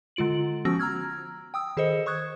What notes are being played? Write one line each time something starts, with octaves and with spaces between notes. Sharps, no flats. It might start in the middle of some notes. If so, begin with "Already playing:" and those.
D3 G#3 F4 D7 F#7
F3 B3 C#4 F#4 E6 A#6
A#5 E6 F6 G#6
G5 D#6 E6
D#3 G#4 A4 C5 D#5 C#7
C5 C#6 D#6 F#6 G#6